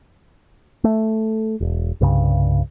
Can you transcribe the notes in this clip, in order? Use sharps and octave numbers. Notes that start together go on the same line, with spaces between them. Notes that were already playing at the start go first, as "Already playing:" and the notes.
A3
E1
C2 G2 C#3